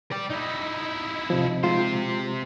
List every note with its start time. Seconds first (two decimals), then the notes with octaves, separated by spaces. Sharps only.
0.11 D5 G5
0.30 D#4 E4
1.30 C3 F3
1.64 C3 G#3 F4 C5